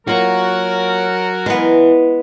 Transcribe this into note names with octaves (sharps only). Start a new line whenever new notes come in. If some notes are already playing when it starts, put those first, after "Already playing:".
F#3 A#3 F4 F#4 A#4
E3 G#3 B3